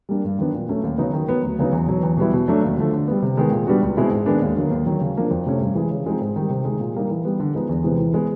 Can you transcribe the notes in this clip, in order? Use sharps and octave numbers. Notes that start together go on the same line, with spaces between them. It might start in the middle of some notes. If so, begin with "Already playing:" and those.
G3 A#3 D4
G2
D#3 F#3 B3 D4
A#2
F#3 A3 C#4
D#2
C#3 F#3 B3 D#4
D#3
F#3 B3
D2
C#3 F#3 B3 D#4
E2
B2 F#3
E2
B2 G3 B3 E4
B2
F#3 A3 D4
D#2
D3 F3 A3
D3
G3 B3
C3
D#3 G#3 B3
A#2
G3 B3 D4 F#4
C#2
B2 G#3 C4 E4
G#2
D#3 G#3 B3 D4
D#2
D3 F#3 A#3
D#2
D#3 F#3
C#3
F3 A#3 D4
F2
C3 F3 A3 C#4
G2
E3 G#3
C#3
F3 G#3 C4 D#4
G#2
D#3 G3
C3
D#3 G#3
A#2
G3 A#3 D#4
E3
G3 B3
D3
F3 G#3 B3 D#4
E2
C3 E3 G#3 B3
E3
G#3 B3